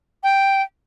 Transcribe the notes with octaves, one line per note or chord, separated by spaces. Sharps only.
G5